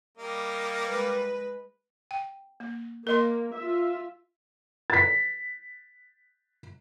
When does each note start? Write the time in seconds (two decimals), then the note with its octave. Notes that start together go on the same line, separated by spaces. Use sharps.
0.18 G3 A#3 D#5
0.86 G#3 B4
2.11 G5
2.60 A#3
3.07 A#3 A#4 D#5 C6
3.55 F4 E5
4.90 A6 B6